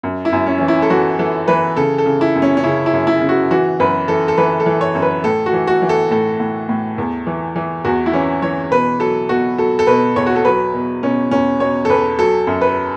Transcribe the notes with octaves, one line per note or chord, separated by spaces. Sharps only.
F#2
E4
F#2
C#4
E3 C#4
E4
A4
E3 F#4
E3 A4
E3 B4
C#3 A4
A4
C#3
E4
F#2
C#4
C#4
C#3 E4
E4
F#2
E4
C#3
F#4
E3 F#4
F#2 B4
E3 A4
A4
E3 B4
A4
E3
C#5
F#2
B4
A2 A4
F#4
E3
F#4
E3
A4
A2 A4
A2
A2
E2
E3
E3
E2 F#4
E4
E3 C#4
E3 C#5
B2 B4
F#3 A4
B2 F#4
F#3 A4
A4
B2 B4
E2 C#5
F#4
A4
F#3 B4
B2
B2 C#4
E2 C#4
B2 C#5
A4
E2 B4
F#3 A4
F#2
B4